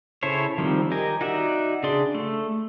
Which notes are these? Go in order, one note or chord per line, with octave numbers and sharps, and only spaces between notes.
C#3 E4 A4 C5 C#5
D#3 F3 G3 C4
G4 A#4 D#5 G#5
D#4 F#4 D5 E5
C#3 D4 G#4 D5 C6
A3